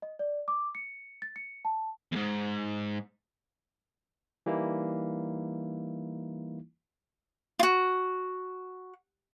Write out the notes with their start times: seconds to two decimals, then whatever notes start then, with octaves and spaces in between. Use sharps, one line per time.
0.02 D#5
0.19 D5
0.48 D6
0.75 C#7
1.22 A6
1.36 C#7
1.65 A5
2.12 E2 G#2
4.46 E3 G3 A#3 D#4 E4
7.59 F4 F#4